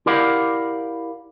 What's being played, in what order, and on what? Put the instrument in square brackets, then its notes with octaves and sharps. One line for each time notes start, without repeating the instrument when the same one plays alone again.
[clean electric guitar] E4 G4 A#4 D5 F5 F#5